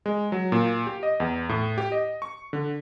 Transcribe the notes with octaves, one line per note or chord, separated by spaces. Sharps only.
G#3
F#3
A#2
G4
D#5
E2
A2
G4
D#5
C#6
D3